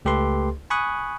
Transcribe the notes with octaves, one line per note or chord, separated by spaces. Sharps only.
C#2 A3 G4 A4 B4 C6
G#5 B5 C#6 D#6 F#6